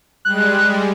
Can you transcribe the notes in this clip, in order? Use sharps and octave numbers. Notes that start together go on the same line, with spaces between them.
G3 G#3 F#6